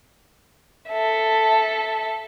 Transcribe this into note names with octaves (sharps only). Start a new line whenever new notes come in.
A4 E5